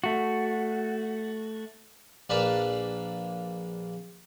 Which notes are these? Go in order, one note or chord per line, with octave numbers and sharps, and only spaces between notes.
A3 F#4
A#1 A#3 B4 D5 F5 A5